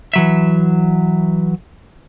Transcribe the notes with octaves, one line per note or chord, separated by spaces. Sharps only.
E3 F#3 E5